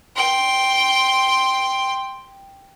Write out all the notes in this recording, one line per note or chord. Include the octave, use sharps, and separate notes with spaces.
G5 C6